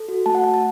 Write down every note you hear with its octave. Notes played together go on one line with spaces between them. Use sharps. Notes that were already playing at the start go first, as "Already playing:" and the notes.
Already playing: A4
F#4
A3 A5
F#5
A3 A5
A5